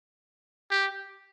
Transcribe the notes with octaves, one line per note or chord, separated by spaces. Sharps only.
G4